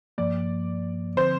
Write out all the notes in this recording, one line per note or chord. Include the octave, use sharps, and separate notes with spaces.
G2 F3 A#3 D5
D3 F3 C4 C5